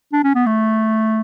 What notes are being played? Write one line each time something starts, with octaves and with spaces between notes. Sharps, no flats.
D4
C#4
B3
A3